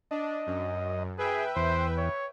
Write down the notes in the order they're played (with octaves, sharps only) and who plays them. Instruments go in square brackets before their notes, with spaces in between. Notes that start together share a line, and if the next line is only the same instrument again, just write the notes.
[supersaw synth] D4 [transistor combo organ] D#5
[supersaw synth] F#2
[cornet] G#4 [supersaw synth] B4 E5 G5
[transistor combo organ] E2 [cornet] C5
[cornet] C#5